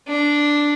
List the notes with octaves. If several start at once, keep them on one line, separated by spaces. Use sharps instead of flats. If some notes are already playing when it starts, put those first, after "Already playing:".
D4